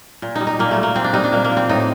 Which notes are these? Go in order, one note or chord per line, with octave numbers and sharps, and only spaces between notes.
A#2
G3 D#4
D#4
A#2 A#3
A3
G3
A#3
A#2 C4
D4
G3 D#4
D4
A#2 A#3
A#3
F3
C4
A2 D#4